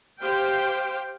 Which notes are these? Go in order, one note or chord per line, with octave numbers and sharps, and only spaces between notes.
G4 C5 F5 G5